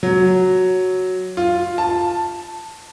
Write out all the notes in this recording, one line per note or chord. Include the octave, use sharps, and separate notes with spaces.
F#3
F4
A5